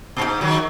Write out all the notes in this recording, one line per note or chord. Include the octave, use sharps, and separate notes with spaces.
A#2
G#2
D#3 F#3